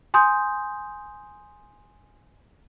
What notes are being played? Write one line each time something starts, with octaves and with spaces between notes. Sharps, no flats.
G#5 C6 D#6 G6